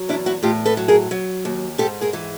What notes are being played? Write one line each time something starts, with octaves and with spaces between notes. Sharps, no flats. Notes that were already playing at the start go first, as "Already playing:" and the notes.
Already playing: F#3
E2 D4 E4
E4 F#4
A2 F4 G4
A4 B4
F#3
G#4 A#4
F#3
D#2
G#2 G4 A4
G#4 A#4
E3